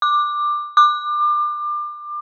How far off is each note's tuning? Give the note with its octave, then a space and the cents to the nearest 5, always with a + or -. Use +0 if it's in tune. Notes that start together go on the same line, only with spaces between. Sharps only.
D6 +10
D6 +25